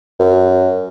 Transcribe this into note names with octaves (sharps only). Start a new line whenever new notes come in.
F#2